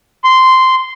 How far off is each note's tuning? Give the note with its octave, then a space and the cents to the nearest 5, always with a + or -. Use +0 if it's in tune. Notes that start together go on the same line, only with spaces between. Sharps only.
C6 -10